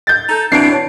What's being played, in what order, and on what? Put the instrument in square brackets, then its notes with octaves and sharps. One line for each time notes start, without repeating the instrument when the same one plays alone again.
[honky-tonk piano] G6 A6
[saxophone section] D#4 A4
[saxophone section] B2 E3 [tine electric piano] C4 D4 [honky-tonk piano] C7 D7
[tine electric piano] C#5 A5